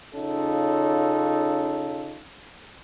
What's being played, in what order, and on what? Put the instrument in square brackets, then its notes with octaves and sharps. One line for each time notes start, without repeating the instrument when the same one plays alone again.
[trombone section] C#3 C#4 D#4 F4 A4